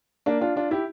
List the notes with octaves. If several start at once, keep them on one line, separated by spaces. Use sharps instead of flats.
A#3 D4
D4 F4
D4 F4
E4 G4